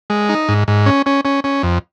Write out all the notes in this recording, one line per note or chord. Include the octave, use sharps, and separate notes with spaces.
G#3
D#4
G#2
G#2
C#4
C#4
C#4
C#4
F2